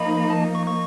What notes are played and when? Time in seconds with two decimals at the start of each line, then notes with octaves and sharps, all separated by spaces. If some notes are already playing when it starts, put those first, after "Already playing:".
Already playing: F3 A#3 D#4 B5
0.30 A5
0.55 C#6
0.67 C#6